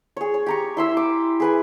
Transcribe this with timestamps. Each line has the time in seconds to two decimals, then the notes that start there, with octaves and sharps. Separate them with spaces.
0.17 G#4 C#5
0.34 C#5
0.46 G4 A#5 C#6
0.77 E4 C6 E6
0.97 D6
1.40 G#4 B4 G#5